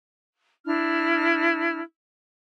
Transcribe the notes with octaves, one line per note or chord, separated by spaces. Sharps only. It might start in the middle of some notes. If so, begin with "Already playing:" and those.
D4 E4 F6